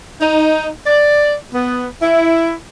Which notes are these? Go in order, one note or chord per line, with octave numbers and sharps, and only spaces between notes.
D#4
D5
B3
E4